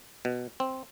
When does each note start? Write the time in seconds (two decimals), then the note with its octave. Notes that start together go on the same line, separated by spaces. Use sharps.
0.25 B2
0.60 C4